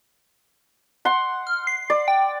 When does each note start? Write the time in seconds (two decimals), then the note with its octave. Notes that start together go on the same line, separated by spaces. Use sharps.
1.05 F#5 C6
1.47 F6
1.67 C7
1.90 D5
2.08 G5